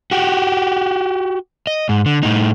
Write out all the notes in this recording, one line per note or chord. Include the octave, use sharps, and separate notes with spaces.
F#4 G4
D#5
G#2
D3
A2 D#4